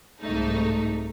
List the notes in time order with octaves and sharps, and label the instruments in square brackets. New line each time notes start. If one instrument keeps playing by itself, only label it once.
[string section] C2 G#2 A3 D#4